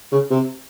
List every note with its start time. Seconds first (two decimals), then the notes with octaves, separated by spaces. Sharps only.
0.12 C#3
0.30 C3